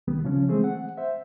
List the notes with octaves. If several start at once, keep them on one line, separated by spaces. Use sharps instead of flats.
C2 D#3 G3 B3
C#3 F3 C#4
E3 G#3 A3 C4 G#4 C5
F#5
C5 E5